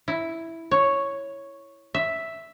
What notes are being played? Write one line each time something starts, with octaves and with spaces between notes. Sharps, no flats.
E4
C#5
E5